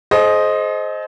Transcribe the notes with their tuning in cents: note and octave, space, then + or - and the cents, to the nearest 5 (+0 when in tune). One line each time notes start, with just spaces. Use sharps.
G#4 +45 C5 +5 D#5 +0